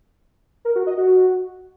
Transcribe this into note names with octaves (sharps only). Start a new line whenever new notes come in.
A#4
F#4
D#5
F#4